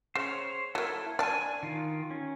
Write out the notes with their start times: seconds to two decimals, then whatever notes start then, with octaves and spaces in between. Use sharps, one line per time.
0.15 C#3 C5 C#5
0.75 F#3 A#3 E4 A4
1.19 D4 D5 G#5 A5
1.63 D#3 F4
2.11 C#4